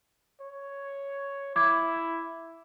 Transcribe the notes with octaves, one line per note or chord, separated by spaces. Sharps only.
C#5
E4 D6 G#6